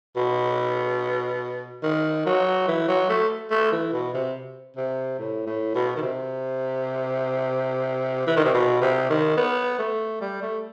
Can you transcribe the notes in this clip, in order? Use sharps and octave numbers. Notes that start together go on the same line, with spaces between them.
B2
D#3
F#3
E3
F#3
A3
A3
E3
B2
C3
C3
A2
A2
B2
D#3
C3
E3
D#3
C3
B2
C3
D#3
B3
A3
G3
A3